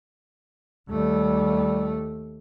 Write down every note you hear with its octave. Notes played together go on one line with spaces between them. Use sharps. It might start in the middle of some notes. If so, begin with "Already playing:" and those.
D#2 G3 A3